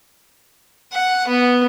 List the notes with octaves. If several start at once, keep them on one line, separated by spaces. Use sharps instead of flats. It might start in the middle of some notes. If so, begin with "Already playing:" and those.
F#5
B3